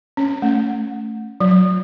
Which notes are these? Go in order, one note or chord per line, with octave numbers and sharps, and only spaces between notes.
C#4
A3
F#3